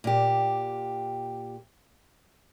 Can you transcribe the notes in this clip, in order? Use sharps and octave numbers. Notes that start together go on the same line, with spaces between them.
A#2 G4